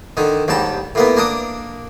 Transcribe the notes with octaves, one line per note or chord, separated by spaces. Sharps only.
D3 D#3
D#2 G#2 G3 A5
A2 A#3 B3
A#3 D4 D#6